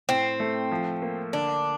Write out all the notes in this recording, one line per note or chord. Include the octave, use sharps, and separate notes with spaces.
A2 C4
A3
F3
A#3
D3 D4